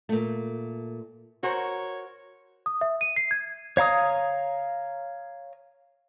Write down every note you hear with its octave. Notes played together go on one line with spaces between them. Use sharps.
A#2 A3
F#4 A#4 C5 C#5
D#6
E5
D#7
C7
G#6
C#5 F5 A#5 D#6